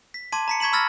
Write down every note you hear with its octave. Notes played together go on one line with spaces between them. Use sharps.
B6
A5 C6 D6 G#6 D#7
A#5 B6 C#7
C#6 G#6 B6 E7 F#7
B5 E6 F6 A6 A#6